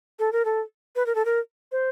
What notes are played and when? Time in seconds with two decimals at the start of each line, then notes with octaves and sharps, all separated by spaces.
0.19 A4
0.33 A#4
0.45 A4
0.96 B4
1.06 A#4
1.15 A4
1.25 A#4
1.72 C5